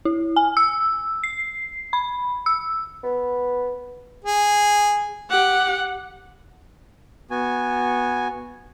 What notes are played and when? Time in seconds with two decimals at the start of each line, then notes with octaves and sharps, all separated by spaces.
0.05 E4
0.36 G#5
0.57 E6
1.23 C7
1.93 B5
2.46 E6
3.04 B3
4.24 G#4
5.31 G4 F#5
7.30 B3 F#4 G#5